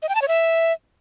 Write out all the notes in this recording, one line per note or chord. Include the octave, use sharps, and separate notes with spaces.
D#5
G5
A5
C#5
E5